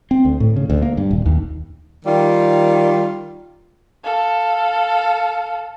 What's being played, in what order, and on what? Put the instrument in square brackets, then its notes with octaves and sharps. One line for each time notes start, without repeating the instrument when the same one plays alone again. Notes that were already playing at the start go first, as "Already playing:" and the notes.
[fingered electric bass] C4
D2
A2
C#3
D2
A#3
G2
D#1
D#2
[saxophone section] D#3 G3 F4
[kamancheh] A4 F5